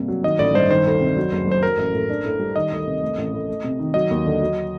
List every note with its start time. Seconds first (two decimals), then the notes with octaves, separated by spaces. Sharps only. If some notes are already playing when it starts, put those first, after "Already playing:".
Already playing: G2 C3 A#3
0.08 F#3
0.23 D#3 D#5
0.39 A1 D5
0.55 G2 C5
0.70 D#3 C5
0.86 D2
1.01 C3
1.16 F#3
1.32 F#1
1.47 F#2 C5
1.63 F#3 A#4
1.78 A1
1.94 A2
2.10 D4
2.25 A2
2.39 G3
2.55 D#3 D#5
2.72 D2
2.87 C3
3.02 A3
3.18 A1
3.33 A2
3.48 A3
3.64 C3
3.79 D#3
3.94 F#3 D#5
4.11 D#2
4.25 D3
4.41 F#3